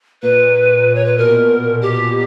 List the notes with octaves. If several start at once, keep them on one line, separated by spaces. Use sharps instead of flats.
A#2 B4
A#2
A#2
C#5
B4
B2 A#4
G4